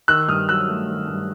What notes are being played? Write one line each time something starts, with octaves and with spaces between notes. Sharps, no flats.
D#3 E6 F#6
G2 D#6 F6
F#3 E6 F#6
A3
D#3
G2